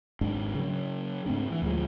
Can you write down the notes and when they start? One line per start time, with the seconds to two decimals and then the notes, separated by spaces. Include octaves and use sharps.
0.21 G#1 G#2 D4
0.55 C#3 F#3
1.26 G#2 A3 C4 D4
1.50 E3
1.62 D2 A2 F3 G#3